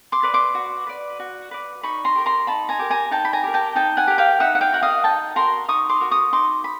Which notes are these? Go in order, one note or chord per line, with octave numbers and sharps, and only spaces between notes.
C6 D6
B4 D5
C6 D6
F#4
B4 D5
F#4
B4 D5
D#4 B5 C#6
A#5 C6
G4 A#4
A#5 C6
D#4 A5 B5
G#5 A#5
G4 A#4
G#5 A#5
D#4 G5 A5
B5
G#5 A#5
G4 A#4
G5 A5
D#4 G5 A5
F#5 G#5
G4 A#4
F5 G5
D#4 E5 F#5
F#5
F5 G5
F#4 A#4 F#5
D#5 F5
D#4 G5 A5
F#4 A#4 A#5 C6
D#4 C#6 D#6
C6 D6
F#4 A#4
C#6 D#6
D#4 C6 D6
B5